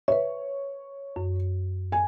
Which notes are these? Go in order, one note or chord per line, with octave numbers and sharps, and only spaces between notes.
B4 C#5 E5
F#2
G#5